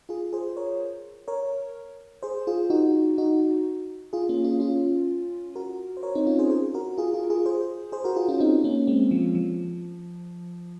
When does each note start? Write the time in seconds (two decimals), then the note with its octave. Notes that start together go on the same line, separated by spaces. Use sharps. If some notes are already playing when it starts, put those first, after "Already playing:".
0.09 F4 G#4
0.33 G#4 C5
0.57 A#4 C#5
1.28 A#4 C#5
2.23 G#4 C5
2.47 F4 G#4
2.70 D#4 F#4
3.18 D#4 F#4
4.13 F4 G#4
4.29 A#3 C#4
4.44 C#4 F4
4.60 C#4 F4
5.55 F#4 A#4
5.97 C5
6.03 A#4 C#5
6.15 C4 D#4
6.27 C#4 F4
6.39 G#4 C5
6.50 G#4 C5
6.74 F#4 A#4
6.98 F4 G#4
7.13 F4 G#4
7.30 F4 G#4
7.46 G#4 C5
7.92 G#4 C5
8.04 F#4 A#4
8.16 F4 G#4
8.28 C#4 F4
8.40 C4 D#4
8.64 A#3 C#4
8.87 G#3 C4
9.11 F3
9.35 F3